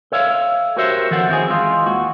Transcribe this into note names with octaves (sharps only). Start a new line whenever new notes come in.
A4 C#5 E5 F5
F#4 G4 A#4 C5 C#5 E5
F2 D#3 F#4 A4 C5 F#5
C4 E4 F#4 G#4
E3 G#3 F4
D#2 F#4